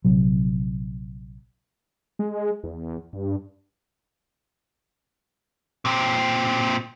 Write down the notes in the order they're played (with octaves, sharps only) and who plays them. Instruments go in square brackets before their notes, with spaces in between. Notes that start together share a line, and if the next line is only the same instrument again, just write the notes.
[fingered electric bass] A#1 C3 F#3
[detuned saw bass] G#3
E2
G2
[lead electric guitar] A#2 C4